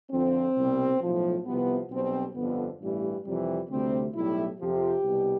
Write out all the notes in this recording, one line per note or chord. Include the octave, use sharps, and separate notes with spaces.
F2 D3 F3 C4
C2 B2 G3
B1 A2 F3
C2 C3 F3 B3
B1 B2 G3 C4
G1 F2 D3 B3
A1 G2 E3 G3
F2 C3 E3 G3
D2 C3 G3 C4
B1 A2 G3 E4
F2 C3 F3 G4
C2 B2 G3